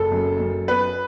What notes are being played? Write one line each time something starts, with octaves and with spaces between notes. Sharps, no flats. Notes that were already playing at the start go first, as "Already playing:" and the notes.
Already playing: F#1 A4
F#2
F#2
B3 B4